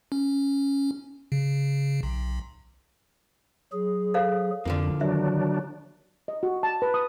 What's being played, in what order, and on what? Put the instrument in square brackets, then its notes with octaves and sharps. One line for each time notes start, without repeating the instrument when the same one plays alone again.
[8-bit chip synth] C#4
C#3
B1
[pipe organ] F#3 G#4
[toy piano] A4 C5 F5
[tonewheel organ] F2 [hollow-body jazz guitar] D3 F3 A#3
[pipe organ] D#3 [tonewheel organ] F#3 D4 [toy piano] E5
[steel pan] D#5
F#4
A5
B4
D#6